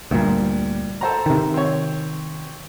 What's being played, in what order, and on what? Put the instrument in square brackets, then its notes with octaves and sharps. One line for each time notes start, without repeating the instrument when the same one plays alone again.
[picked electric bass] D2 A#2 [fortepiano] G2
[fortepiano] A4 C5 A#5
[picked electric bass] C3 D#3
[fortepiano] C4 C#5